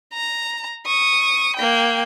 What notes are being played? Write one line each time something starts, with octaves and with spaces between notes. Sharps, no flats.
A#5
C#6 D#6
A#3 G5